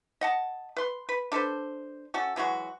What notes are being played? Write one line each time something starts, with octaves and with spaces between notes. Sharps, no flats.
D#5 F#5 A5
B4 C6
B4
D4 A4 B4 C5
C#4 F#4 A4
E3 F#3 G#3 F#4